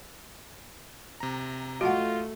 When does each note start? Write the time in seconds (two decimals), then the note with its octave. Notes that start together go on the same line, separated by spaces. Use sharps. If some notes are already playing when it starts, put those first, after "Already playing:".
1.20 C3 A#5
1.81 A3 F4 F#4 D#5 F#5 A5 C#6